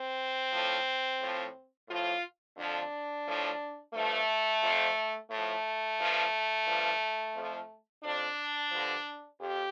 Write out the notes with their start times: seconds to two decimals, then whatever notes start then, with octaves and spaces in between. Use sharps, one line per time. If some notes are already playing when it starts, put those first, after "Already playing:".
Already playing: C4
0.52 A2 F3
1.21 A2 F3
1.89 A2 F3 F4
2.57 F2 D3 F3 D4
3.26 A2 F3
3.94 G2 F3 A3
4.63 F2 C3 F3
5.30 A2 F3 A3
5.98 G2 F3
6.66 G2 F3
7.35 F2 F3
8.03 F2 F3 D4
8.71 G2 D3 F3
9.40 F2 G4